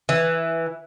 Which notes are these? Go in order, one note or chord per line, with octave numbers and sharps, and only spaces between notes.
E3